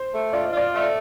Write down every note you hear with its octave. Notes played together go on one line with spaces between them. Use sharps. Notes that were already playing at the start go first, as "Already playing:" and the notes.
Already playing: C5
A3
F4 D5
D#5
F4 D5
A3